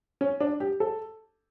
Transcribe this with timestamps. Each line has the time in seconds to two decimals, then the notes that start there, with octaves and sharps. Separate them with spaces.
0.21 C#4
0.40 D4
0.60 G4
0.80 A4